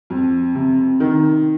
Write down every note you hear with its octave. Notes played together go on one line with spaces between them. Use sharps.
F2
C3
D#3